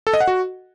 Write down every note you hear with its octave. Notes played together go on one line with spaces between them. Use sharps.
A4
D#5
F#5
F#4